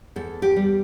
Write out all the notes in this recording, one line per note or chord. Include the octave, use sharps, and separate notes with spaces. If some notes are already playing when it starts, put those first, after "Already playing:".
E2 A4
G4
G3